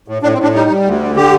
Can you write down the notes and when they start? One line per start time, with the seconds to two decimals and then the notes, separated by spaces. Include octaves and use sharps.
0.08 A2
0.22 A2 D4
0.33 C4
0.38 A2 D4
0.54 G3 D#4
0.70 G3
0.84 D2
1.01 D3
1.16 D3 G4